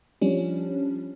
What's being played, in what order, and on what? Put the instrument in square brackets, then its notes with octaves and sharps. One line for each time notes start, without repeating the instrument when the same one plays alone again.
[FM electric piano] F3 G3 C#4 D4